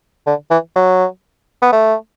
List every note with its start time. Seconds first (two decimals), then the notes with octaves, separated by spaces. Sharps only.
0.27 D3
0.51 E3
0.76 F#3
1.62 B3
1.72 A3